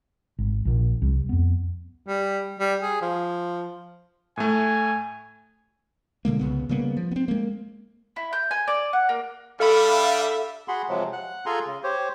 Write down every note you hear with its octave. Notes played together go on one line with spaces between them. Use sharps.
G#1
A#1 A#2
C2
F2 B3
G3
G3
G#4
F3
A2 A3 G#5
B2 D3 G#3 A#3
C2 C#3 B3
C#3 G3 A#3 B3
F3
B3 C4
G#3 A#3
E4
G6
G#5
D5
F#5
A#3
G3 D4 A4 E5 F5 B5
F#4 G#4 F#5 B5 C6
C3 F3 F#3 G#3
F#5 F#6
F4 G#4 A4 G#5 A#5 C6
C#3
G4 C5 C#5